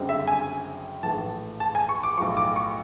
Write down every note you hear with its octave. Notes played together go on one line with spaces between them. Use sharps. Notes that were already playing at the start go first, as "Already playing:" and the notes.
Already playing: F#1 F#2 D3 G3 C4
E5
G#5
A#1 A2 E3 A5
A5
G#5
C#6
D6
B1 A2 F3 C#6
D6
C#6